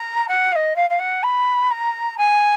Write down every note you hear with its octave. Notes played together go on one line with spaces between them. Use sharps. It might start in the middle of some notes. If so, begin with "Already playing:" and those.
Already playing: A#5
F#5
F5
D#5
F5
F5
F#5
B5
A#5
G#5